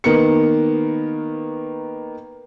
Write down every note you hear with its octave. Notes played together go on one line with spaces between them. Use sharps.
D#3 A#3 B3 C#7